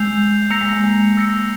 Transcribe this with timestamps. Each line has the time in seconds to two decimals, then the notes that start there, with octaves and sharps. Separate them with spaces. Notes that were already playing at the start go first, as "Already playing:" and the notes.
Already playing: G#3 E6 G6 C7 F7
0.50 A#3 E6 A#6 C#7 F7
0.61 G#3
0.73 A#3
0.84 G#3
1.17 E6 A#6 C#7